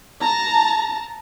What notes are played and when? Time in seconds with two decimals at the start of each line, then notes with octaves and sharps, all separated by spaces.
0.20 A5 A#5